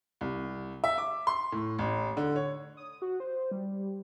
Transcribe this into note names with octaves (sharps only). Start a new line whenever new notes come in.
C2
E5
D6
C6
A2
A1
D3
C#5
D#6
F#4
C5
G3